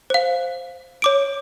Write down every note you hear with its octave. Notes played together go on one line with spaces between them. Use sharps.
C5 F5
C#5 D6 D7